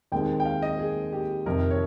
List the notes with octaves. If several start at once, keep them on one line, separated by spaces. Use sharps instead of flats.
D#2 D#3 G#3 C4 D#4 G5
G5
F5
D#5
G#4
G4
F2 C3 D#3 A#4
C#5